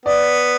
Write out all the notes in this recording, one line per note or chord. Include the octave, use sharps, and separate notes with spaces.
B3 D5